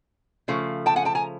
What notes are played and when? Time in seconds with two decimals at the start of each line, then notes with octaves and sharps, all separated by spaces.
0.48 C#3 F3 A3
0.86 G5 A5
0.96 F#5 G#5
1.05 G5 A5
1.15 G#5 A#5